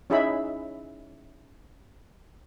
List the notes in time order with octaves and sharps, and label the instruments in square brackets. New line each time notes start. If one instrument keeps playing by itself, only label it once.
[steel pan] C#4 D#4 E4 G#4 E5 B5